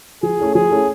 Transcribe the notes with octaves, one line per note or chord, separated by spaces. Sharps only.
F3 G#4
A3 C#4 E4 A4
F3 G#4
A3 C#4 E4 A4